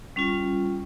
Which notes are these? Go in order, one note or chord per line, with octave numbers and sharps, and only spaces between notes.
G3 C#4 F4